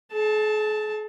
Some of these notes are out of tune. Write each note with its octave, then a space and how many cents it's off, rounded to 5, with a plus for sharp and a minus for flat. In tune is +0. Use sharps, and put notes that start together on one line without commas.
G#4 +45 A5 +5